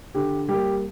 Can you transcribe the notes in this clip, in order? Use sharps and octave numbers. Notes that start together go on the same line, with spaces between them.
D3 G4
G3 A#3 G4